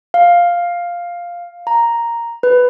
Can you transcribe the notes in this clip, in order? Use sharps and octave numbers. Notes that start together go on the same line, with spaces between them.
F5
A#5
B4